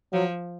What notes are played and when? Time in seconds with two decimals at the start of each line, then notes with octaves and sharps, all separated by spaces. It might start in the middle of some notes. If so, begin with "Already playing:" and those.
0.13 F3 F#3